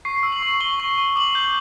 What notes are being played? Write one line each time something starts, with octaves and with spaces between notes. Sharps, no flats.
C#6 C7
E6
F#7
C#6
C#6 G7
C#6
C#6
D6 F#7
G6